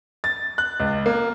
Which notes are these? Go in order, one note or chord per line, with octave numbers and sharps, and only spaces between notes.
A6
F#6
C#2
A#3